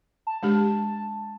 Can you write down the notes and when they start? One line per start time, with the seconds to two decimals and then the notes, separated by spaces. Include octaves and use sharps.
0.27 A5
0.43 G#3 D4 G4